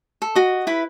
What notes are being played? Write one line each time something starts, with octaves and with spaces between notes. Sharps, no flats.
A4
F#4 D#5
E4 B4 B5